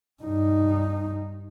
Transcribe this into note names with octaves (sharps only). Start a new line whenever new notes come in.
G2 D#4